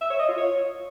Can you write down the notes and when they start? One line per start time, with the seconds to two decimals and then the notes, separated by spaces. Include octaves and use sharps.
0.01 E5
0.10 C#5
0.19 D#5
0.28 F4
0.38 C#5